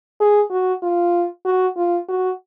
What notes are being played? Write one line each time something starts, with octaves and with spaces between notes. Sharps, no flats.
G#4
F#4
F4
F#4
F4
F#4